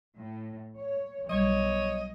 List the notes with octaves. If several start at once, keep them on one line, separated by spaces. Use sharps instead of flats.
A2
C#5
B1 G3 C#5 D#5